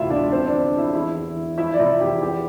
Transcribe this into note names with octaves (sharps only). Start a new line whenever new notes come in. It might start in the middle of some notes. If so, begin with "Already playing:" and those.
Already playing: A1 D2 C3 E4 F4 E5
E1 D4 D5
F3 C4 C5
D4 D5
D3
E2 E4 E5
E2 E4 E5
E3
E3
F3 E4 E5
D5
C3 E4 E5
E2 G4
E2 G4